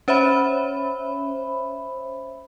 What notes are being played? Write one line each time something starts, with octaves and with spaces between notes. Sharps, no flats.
C#4 C5 C#5 E5 B5